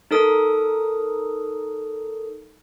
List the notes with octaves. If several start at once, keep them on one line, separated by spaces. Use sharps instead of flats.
D#4 A4 A#4 D#6